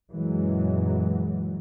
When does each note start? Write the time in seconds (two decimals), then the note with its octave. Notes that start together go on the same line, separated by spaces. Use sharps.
0.12 F#2 A#2 E3 F#3 G#3